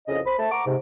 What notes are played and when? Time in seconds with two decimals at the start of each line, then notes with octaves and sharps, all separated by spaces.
0.08 C2 F2 C#3 D#5
0.26 C5 B5
0.39 A3 A5
0.51 F#5 A#5 C#6 D6
0.66 G#2 C3